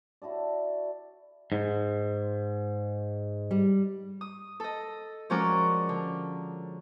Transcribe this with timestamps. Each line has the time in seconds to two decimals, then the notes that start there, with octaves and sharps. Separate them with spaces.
0.22 E4 F#4 A4 D5
1.52 G#2
3.51 G3
4.21 D#6
4.60 A4 D#5
5.30 F3 G#3 C#4 F#4 A#4 D5
5.89 D3